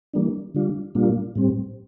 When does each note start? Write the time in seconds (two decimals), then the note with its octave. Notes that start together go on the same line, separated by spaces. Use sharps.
0.13 E3 G3 A#3 D4
0.55 D3 G3 D4 F4
0.95 A#2 G3 A#3 D4 F4
1.35 A2 G3 C4